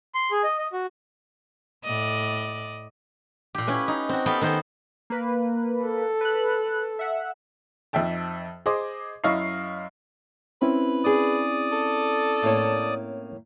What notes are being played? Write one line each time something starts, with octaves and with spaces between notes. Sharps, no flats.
C6
G#4
D#5
D#5
F#4
A2 D5 D#5
A#2 G4
C#4 E4 B4
D#4
C4 F#4
B3 C#4 A4 E5 F5 G5
D#3 B3 C5
A#3 B4
A4
B4 F#6
E5 F#5
F2 D#4 E5 G5 A5
G#4 C5 D#5 D6
F#2 E4 D#5 F5 C#6 C7
C4 C#4 E4 B4
D4 G#4 D5 D#6
A4
A2 A#3 C#5